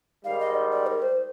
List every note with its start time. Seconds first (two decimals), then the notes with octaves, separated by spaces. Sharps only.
0.24 G#2 D#3 G3 F5
0.40 D#5
0.55 D5
0.71 D5
0.86 A#4
1.02 C5